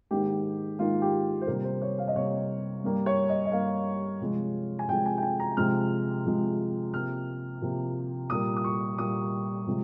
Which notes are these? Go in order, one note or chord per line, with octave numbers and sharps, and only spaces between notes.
G#2 D#3 A#3 G4
G#2 D#3 A#3 F4
G4
C5
C3 G3 A#3 A#4
C5
C#5
F5
D#5
C3 G3 A#3 C#5
G2 G3 A#3
C#5
D#5
D#5
G2 G3 A#3 F5
C3 F3 G#3
G#5
C3 F3 G#3 G5
G#5
G5
G#5
A#5
C3 F3 G#3 F6
C3 F3 G#3
C3 F3 A#3 F6
C3 F3 A#3
A#2 G3 A#3 D#6
D#6
C#6
A#2 G3 A#3 D#6
C3 F3 G#3